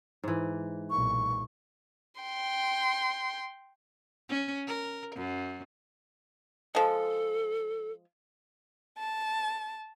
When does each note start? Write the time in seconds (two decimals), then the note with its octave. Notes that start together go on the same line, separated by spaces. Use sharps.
0.24 G#2 E3
0.91 B1 A#2 C#6
2.21 G5 C6
4.29 C#4
4.67 A#4
5.15 F#2
6.75 F3 G#3 A4
8.97 A5